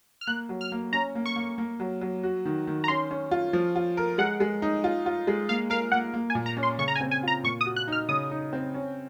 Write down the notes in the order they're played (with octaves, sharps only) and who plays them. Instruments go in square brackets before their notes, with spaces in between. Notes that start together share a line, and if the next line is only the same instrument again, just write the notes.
[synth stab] F6
[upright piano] A#3 [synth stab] F#6
[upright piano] F#3
[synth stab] F6
[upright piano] A#3
[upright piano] C#4 [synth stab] A#5
[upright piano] A#3
[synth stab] C#6
[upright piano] A#3
A#3
F#3
F#3
F#4
D#3
D#3
[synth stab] A#5
[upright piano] C#4 [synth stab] C6
[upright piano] C#4
F4
F3
F4
A#4
[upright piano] G#3 [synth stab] F#5
[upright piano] G#3
D#4
F4
F4
G#3
[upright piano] A#3 [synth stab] F5
[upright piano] A#4 [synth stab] F5
[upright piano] A#3 [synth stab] F#5
[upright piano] A#3
[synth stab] G#5
[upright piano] A#2
[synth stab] A#5
[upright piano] C#4
[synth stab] C6
[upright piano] C#3 [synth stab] C#6
[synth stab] A#5
G#5
[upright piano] C4
[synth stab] G#5
[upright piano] F4 [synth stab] A#5
[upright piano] A#2 [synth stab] C#6
[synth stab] D#6
[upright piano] F#4
[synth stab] F#6
[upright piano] D#4 [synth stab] F6
[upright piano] C#3 [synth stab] D#6
[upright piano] D#4
C4
C#4